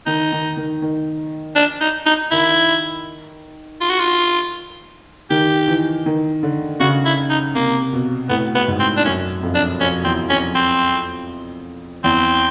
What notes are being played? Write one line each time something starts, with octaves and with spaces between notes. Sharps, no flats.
D#3 D#4
D#3
D#3
D#3
D4
D#4
D#4
D#3 E4
F4
F#4
F4
D#3 G4
E3
D#3
D3
C#3 F#4
E4
D#4
C3 A#3
B2
A2 B3
B3
G#2
C4
D4
F#2 C#4
F2
D4
F2 C#4
E2 C4
F2 C#4
C4
E2 C4